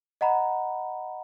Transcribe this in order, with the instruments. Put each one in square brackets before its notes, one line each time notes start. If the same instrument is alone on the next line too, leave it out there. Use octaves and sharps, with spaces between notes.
[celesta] D#5 F#5 A#5 B5